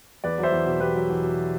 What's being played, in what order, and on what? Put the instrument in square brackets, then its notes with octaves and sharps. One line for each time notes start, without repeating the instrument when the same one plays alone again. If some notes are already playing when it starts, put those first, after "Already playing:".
[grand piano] E2 B4 D5
F#3
C5 E5
E2
B2
E2 G4 B4
F#3
E2
B2